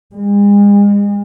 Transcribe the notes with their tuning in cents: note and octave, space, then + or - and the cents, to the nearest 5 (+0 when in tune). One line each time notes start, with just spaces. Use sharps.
G#3 -40